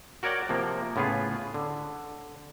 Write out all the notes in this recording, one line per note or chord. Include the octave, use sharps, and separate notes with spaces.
F#4 A#4 C#5 D5 F#5 G5
C3 F3 A#3
A2 C#3 B3 F4 G#4
D3